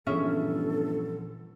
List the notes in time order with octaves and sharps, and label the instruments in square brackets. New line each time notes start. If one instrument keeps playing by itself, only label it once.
[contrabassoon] G1 [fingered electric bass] A#2 E3 F3 [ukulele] C#4 G#4 E5 [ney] A4